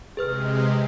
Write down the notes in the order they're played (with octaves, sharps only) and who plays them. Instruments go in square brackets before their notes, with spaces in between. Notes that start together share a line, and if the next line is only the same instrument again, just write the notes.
[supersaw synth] C3 G#3 [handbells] G#4 B4 F6